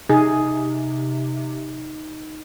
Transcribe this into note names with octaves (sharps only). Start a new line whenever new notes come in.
C3 D#4 G#4